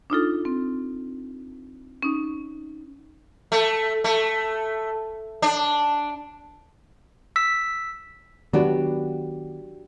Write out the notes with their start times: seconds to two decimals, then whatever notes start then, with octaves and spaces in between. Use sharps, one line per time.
0.10 D4 D#4 F4 A4
0.45 C4
2.03 C#4 D#4
3.52 A3
4.04 A3
5.42 D4
7.36 E6 B6
8.53 D#3 F#3 B3 D4 F#4 G4